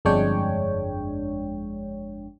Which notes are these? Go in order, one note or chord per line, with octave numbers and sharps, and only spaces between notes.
G1 F2 G#3 D4 C#5 G5